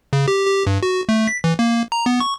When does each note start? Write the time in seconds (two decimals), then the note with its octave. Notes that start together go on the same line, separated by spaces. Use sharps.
0.13 C#3
0.28 G4
0.46 G4
0.67 G2
0.83 F#4
1.09 A3
1.28 B6
1.44 E3
1.59 A#3
1.92 A#5
2.06 B3
2.20 C#6